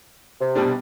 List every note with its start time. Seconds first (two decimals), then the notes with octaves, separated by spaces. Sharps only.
0.41 C3
0.55 B2 G3 D4